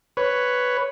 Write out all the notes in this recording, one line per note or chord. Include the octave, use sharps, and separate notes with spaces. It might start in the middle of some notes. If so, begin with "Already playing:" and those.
B4 C#5